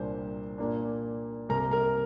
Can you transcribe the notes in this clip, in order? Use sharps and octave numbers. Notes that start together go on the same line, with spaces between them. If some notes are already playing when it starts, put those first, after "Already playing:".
Already playing: C2 A#2 A#3 D4 C5
A#2 A#3 D4
C2 C3 A#3 A#4 A#5
A#4 A#5